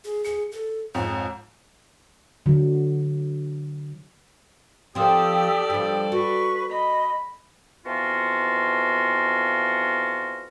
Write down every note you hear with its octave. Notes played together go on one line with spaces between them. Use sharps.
G#4
G#4 C#7
A4
F2 G#2 C#5
D3 F#3
F3 C4 G4 A4 D5 D#6 E6
G2 F3
F#4 B4 C#6
D#5 B5
F2 E3 B3 F4 F#4